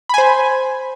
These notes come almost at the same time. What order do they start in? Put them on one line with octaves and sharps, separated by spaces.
B5 G#5 C5